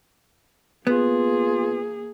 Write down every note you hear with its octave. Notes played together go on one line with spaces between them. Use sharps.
A#3 B3 F4 G#4